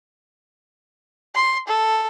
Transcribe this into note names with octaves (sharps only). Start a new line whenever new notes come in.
C6
A4